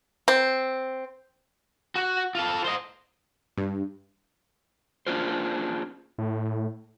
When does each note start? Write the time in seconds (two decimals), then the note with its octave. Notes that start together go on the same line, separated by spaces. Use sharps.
0.28 C4
1.95 F#4
2.35 F4 A4
2.64 C5 D#5
3.57 G2
5.07 A#3 C#4 D4 F4 G#4 C5
6.18 A2